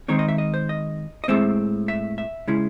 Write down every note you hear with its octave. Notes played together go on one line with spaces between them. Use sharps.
D#3 G#3 C4 D#4 C#5
D#5
E5
D#5
C5
D#5
D#5
A2 G#3 C4 E5
E5
E5
C#3 G#3 C#4 E4